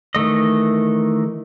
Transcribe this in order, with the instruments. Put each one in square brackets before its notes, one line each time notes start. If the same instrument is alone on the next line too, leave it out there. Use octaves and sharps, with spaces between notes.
[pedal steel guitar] D#3 E3 A3 D#5